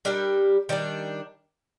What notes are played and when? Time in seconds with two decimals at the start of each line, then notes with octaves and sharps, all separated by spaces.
0.05 G3 D4 G4 A#4
0.69 D#3 G3 D4